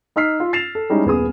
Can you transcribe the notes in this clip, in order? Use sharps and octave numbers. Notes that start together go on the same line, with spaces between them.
D#4 D#5 E6 F6 B6 C7
F4
A6 C7 E7 F7
A4
G3 G#3 C#4 D#4 E4
D#1 B3 G#4 D#6